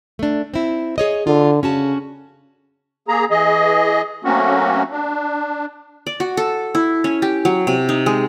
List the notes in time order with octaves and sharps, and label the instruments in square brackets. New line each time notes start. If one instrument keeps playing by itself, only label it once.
[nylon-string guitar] A3 D4
C4 E4
G#4 C#5 D#5
[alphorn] D3 [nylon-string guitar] F4
[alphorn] C#3 [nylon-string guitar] C#4 F#4 A5
[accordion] A#3 G#4 A#5
E3 G#4 D#5
F#3 A3 A#3 C4 C#4 F#4
D4
[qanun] D5
F#4
A4
E4
C#4
G4
F#3
C3
D#4
G#3